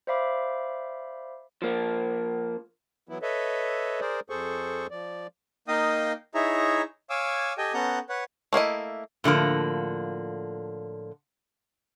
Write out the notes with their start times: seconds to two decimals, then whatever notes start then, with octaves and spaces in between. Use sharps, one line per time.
0.07 C5 D5 E5 F5 B5 D6
1.62 F3 A#3
3.09 E3 F#3 B3 E4
3.22 A4 B4 C#5 D#5 E5
4.01 G#4 A#4 C5 D5
4.30 F2 G#4 A4 C5 C#6
4.91 F3 D5
5.68 A#3 D#4 D#5 F5 G5 D#6
6.35 D#4 E4 G#4 C#5 E5 A#5
7.10 C#5 F5 G#5 D6 E6
7.58 G4 A4 D#5 G5 G#5
7.74 B3 C#4 A4 F#5 A#5 G6
8.09 B4 C#5 F#5
8.53 A3 A#3 E4 D#5
9.24 A2 D3 F3 A#3